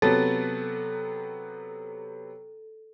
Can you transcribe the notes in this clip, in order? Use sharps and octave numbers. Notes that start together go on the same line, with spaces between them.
C3 F#3 B3 A4